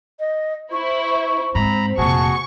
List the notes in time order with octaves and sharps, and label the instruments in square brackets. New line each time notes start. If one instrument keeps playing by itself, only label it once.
[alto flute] D#5
[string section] E4 C5 [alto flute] C#6
[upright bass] G#2 [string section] C4 [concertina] A#5 B5
[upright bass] F1 A#2 [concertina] F#4 G#4 [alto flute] A5 [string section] C#6